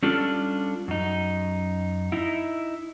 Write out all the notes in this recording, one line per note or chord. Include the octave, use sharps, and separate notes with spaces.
G3 C#4 D4 F4 A4
F#2 D#4
D#4 E4